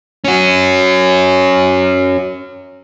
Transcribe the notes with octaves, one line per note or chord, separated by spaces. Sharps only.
C#4 F#4